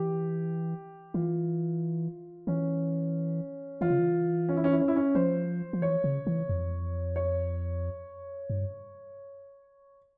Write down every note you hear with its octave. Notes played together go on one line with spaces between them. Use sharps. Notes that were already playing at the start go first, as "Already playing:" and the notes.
Already playing: E3 G4
E3 F4
E3 C#4
E3 F4
C#3
E3
C#4
E4
C#4
E4
C#4
E4
C#4
F3 C5
F3
E3 C#5
C#3
E3
F2
C#5
G2